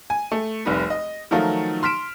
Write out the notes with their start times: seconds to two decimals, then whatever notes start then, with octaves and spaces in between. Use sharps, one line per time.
0.10 G#5
0.32 A3
0.65 F1 C2 D#4 B4
0.90 D#5
1.31 D#3 F3 F#3 A3 D#4 F4
1.83 C6 F6 B6 D7 E7